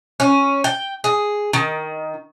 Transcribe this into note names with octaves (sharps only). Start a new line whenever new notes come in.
C#4
G5
G#4
D#3